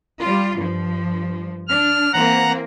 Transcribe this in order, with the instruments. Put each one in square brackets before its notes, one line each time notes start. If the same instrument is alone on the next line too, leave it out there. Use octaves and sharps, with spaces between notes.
[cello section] G3 F4
G2 F3
[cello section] D4 [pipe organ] F6
[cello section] E3 A#3 C4 [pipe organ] F#5 A#5 F#6